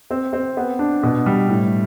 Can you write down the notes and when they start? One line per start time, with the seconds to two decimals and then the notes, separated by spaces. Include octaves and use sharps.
0.11 C4
0.33 C4
0.57 B3
0.79 D4
1.03 B2
1.26 G3
1.49 A2